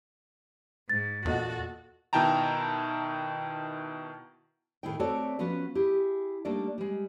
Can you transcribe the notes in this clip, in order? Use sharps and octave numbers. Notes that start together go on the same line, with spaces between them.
G#2 A6
E2 A#2 F#4 A4 D#5 F#5
B2 D#3 E4 G5 A5 A#5
A2 D#3 E4 G#4 G5
A3 C4 F#4 A4 C#5 D5
F3 B3 C#4 F#4 B4
E4 G4 G#4
G3 A3 A#3 D4 D#4 D5
G3 G#3